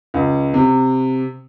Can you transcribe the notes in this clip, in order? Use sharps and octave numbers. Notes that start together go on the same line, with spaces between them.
C#2
C3